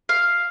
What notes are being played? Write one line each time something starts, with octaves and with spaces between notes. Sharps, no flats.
F5